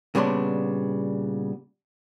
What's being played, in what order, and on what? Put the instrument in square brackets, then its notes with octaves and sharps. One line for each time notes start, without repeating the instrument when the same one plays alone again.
[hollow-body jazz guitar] A#2 C#3 G3 B3 D4 C6